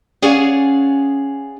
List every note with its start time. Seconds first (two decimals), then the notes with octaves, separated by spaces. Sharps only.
0.22 C#4 G#4 D5 F5 F#5 G#5